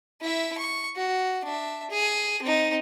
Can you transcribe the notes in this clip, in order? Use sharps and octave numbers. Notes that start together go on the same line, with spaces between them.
E4 E5
C#6
F#4
D4 E5
G#4
C4 D#4